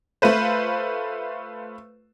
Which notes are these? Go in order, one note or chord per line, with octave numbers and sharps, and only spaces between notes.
A3 F4 B4 C5